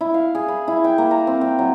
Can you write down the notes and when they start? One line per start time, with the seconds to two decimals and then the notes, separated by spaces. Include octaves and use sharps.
0.01 E4
0.14 F5
0.35 G#4
0.48 B5
0.68 E4
0.84 G5
0.98 A#3
1.11 A#5
1.27 C4
1.41 G5
1.59 F#3